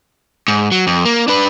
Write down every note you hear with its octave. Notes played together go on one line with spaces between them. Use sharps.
G#2
F#3
F2
A#3
D4 B4